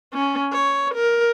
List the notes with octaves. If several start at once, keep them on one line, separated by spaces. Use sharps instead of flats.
C#4
C#5
A#4